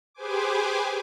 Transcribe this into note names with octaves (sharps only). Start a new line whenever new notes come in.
G4 G#4 B4 C5 G#5 D6